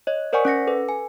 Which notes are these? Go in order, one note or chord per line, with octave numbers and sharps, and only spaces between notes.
C#5 D#5
A#4 C5 D5 F#5 G#5 C#6
C#4 F#5 A#6 C#7
A4 B4
G#5